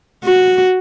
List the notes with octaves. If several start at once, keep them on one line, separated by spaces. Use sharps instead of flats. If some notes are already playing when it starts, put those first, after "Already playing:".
F#4